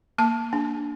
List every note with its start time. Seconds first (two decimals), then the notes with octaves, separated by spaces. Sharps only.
0.18 A#3 A5
0.53 D4